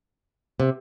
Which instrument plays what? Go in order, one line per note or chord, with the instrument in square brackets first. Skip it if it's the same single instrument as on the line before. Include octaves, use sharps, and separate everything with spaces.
[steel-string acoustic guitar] C3